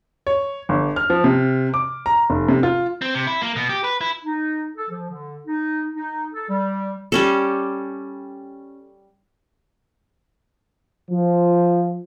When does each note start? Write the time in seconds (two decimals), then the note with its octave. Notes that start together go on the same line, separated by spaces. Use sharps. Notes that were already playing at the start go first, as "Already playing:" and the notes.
0.27 C#5
0.69 G1
0.96 F6
1.10 F3
1.24 C3
1.74 D6
2.06 A#5
2.30 F1
2.48 C3
2.63 F4
3.02 C4
3.15 C3
3.27 E4
3.42 A#3
3.56 B2
3.69 G4
3.84 B4
4.01 E4
4.24 D#4
4.76 A4
4.90 F3
5.10 D3
5.47 D#4
5.95 D#4
6.33 A4
6.49 G3
7.12 G3 C#4 A4
11.11 F3